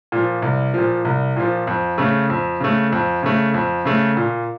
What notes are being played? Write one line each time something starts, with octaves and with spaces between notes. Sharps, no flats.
A#2 F3
C2
A#2 F3
C2
A#2 F3
F2
C#3 A3
F2
C#3 A3
F2
C#3 A3
F2
C#3 A3
A#2